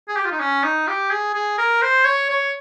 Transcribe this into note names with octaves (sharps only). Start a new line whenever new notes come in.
G#4
G4
F4
D#4
C#4
D#4
G4
G#4
G#4
A#4
C5
C#5
C#5